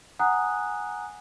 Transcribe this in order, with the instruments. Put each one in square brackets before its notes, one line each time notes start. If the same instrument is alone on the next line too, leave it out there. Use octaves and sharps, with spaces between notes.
[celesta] F#5 G#5 A#5 D#6 F#6